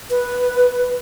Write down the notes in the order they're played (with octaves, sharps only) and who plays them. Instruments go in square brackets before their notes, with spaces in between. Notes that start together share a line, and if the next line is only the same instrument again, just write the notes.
[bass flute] B4